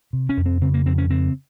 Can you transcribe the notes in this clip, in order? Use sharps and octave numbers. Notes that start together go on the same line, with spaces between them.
C3
C#4
F2
C4
C#3 C4
A#3
F2 C4
C#4
C#3 C4